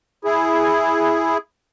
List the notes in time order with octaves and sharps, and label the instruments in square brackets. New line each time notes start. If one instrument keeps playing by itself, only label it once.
[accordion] E4 G#4